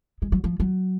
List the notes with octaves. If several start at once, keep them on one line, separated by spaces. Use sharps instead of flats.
G#3
F#3
F3
F#3